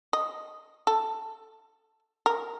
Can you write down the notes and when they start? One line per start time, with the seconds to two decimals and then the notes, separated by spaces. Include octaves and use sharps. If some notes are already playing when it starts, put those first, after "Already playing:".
0.13 D#5
0.87 A4
2.26 A#4